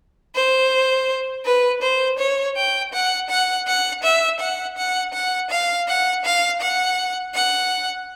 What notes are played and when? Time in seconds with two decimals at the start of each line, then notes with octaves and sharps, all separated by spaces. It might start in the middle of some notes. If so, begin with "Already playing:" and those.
0.35 C5
1.45 B4
1.82 C5
2.18 C#5
2.56 G5
2.93 F#5
3.29 F#5
3.67 F#5
4.03 E5
4.40 F#5
4.77 F#5
5.13 F#5
5.50 F5
5.88 F#5
6.24 F5
6.61 F#5
7.34 F#5